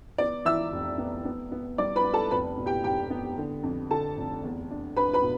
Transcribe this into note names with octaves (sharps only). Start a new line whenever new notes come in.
B3 D5 D6
E3 E5 E6
F1
B3
B3
B3
G3 D5 D6
B4 B5
B3
A4 A5
F1 B4 B5
B2
G4 G5
F1 G4 G5
B3
D3
F2
D3 A4 A5
F1
E2
D4
D4 B4 B5
B4 B5
B2